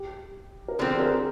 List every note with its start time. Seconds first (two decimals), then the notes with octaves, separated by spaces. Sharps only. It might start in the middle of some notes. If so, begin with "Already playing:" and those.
Already playing: G4
0.68 A#4
0.78 D3 F3 C4 G#4
0.97 G#4
1.00 A#4